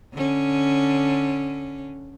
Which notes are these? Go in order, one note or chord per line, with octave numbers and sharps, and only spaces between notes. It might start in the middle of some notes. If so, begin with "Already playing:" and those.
D3 C#4